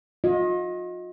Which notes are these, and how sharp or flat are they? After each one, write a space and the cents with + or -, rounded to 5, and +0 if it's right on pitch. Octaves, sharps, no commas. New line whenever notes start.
F4 +45 D#5 +15